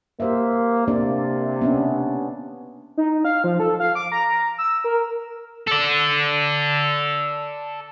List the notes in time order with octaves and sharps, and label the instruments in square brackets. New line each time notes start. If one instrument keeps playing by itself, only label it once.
[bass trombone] A#3 [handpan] G4 C5 E5
[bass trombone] C3 [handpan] A#3 D4 D5
[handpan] B3 C#4 D4
[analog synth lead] D#4
F5
F3
A4
F5
D6
A#5
E6
A#4
[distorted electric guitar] A4 D5